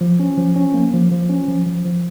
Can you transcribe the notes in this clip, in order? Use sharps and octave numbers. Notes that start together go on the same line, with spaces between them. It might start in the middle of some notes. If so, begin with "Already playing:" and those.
F3
C#4
F3
C#4
A#3
F3
F3
C#4
F3
F3
F3